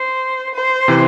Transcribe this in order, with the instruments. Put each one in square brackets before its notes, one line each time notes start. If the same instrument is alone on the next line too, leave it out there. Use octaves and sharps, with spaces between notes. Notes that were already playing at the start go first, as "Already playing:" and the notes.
Already playing: [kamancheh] C5
C5
[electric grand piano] C3 E3